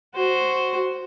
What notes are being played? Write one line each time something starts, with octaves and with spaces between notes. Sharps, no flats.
F#4 C5